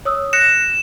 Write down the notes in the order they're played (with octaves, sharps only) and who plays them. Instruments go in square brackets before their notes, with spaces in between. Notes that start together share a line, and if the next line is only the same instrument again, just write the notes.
[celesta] C#5 D#6 E6
[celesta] F#6 A#6 C#7 [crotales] E7